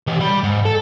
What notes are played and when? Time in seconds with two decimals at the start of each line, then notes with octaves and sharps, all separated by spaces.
0.07 E3 G4
0.20 G3 B5
0.44 G#2
0.65 A4